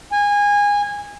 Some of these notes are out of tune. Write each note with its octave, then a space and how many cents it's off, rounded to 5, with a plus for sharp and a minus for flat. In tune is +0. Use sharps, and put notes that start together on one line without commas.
G#5 -20